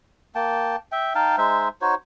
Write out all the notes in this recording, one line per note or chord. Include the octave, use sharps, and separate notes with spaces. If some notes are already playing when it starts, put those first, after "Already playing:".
A#3 G5 A5
E5 G5
D#4 F5 G5 A5
G#3 D#4 C5 E5
D#4 F#4 C5 C#5